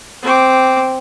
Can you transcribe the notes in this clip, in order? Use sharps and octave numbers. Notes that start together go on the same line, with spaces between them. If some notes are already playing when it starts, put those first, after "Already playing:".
C4 D6